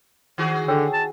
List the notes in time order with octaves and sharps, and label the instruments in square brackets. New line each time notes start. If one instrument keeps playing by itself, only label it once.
[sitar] D#3 F#4 G#4
[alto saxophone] D3 [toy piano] C#5 G5 E6
[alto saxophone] A5